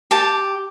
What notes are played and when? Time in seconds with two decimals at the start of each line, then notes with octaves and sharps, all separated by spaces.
0.11 G4 A5